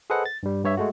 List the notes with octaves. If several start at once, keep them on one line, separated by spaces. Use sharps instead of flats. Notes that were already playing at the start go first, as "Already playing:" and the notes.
G#4 A4 B4 C5 D#5 F#5
A6
G2 G3
G2 C#5 E5
G#3 A3 F#4